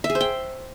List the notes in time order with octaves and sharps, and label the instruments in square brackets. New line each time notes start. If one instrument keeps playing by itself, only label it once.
[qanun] E5
G#4
C5
G5